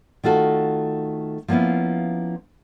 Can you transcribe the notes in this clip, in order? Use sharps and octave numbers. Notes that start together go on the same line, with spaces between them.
D#3 A3 F4 F#4 A4
F3 A#3 B3 C#4 E4